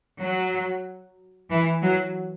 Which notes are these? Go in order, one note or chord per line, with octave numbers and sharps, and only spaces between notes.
F#3
E3
F#3